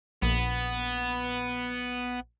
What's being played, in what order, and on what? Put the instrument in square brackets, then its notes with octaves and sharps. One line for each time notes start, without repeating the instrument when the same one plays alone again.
[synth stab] A#1 [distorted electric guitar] B3